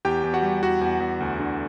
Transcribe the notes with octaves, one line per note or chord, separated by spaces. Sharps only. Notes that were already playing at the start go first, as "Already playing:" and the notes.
E2 G4 G5
E2
F#4 F#5
G3
E2 F#4 F#5
E2
E2
D2
D3